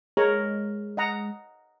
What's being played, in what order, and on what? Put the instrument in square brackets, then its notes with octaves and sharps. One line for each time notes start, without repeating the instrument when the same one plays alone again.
[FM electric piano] G#3 [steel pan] A#4 C#5 A#5
[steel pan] D#5 F#5 A#5